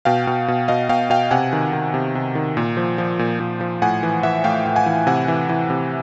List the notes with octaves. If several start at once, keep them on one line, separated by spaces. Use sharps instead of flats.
B2 F5 G5
B2
B2
B2 D#5 F5
B2 F5 G5
B2 F5 G5
C3 F#5 G#5
D#3
D#3
C3
C3
D#3
A#2
F3
F3
A#2
A#2
F3
A2 F#5 G#5
E3
E3 E5 F#5
A2 F5 G5
A2
F#5 G#5
E3
C3 F#5 G#5
E3
E3
C3